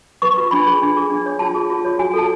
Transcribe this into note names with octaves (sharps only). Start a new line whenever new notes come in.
B4 C#6
F4
D4 B5
G#4
D4
G#4
D4
C#5
F4 A5
G#4
F4
C#5
F#4 G#5
A4 A5